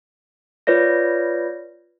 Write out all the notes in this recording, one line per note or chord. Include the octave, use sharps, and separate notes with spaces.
F4 B4 C#5 D5 A#6